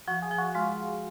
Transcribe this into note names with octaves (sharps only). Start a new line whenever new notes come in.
F3 F#4
G#4
F3
F#4
G#3 F4